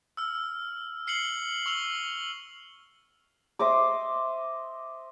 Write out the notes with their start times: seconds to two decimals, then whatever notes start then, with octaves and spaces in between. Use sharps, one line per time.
0.17 E6 F6
1.07 F6 C7 C#7 F#7 G7
1.66 C#6 E6 F7 G7
3.59 C5 D#5 E5 D6